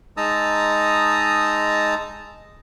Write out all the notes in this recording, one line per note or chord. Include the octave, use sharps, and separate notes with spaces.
G#3 D#4 A5 A#5 D#6 E6